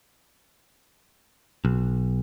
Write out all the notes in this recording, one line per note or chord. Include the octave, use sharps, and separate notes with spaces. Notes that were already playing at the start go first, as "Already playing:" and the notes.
B1